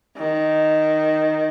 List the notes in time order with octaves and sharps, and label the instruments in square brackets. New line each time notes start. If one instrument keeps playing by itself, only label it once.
[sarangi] D#3